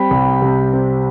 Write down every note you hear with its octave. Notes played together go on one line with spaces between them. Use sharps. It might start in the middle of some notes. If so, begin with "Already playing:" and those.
Already playing: G3 C4 G5 B5
C2
C3
C4